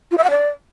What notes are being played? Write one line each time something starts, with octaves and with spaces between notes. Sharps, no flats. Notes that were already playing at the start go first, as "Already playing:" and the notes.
F4
E5
F#5
D5